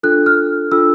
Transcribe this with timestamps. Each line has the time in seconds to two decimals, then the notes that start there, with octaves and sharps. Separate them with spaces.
0.03 D4 F4 A4 F#6
0.26 F6
0.72 D4 F4 A4 E6